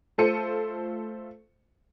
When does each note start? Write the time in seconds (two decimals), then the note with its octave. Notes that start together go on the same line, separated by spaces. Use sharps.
0.18 A3 F4 A4 C5 C#7 D#7